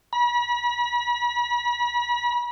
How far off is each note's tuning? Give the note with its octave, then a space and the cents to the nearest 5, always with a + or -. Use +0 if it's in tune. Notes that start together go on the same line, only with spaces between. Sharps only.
B5 -40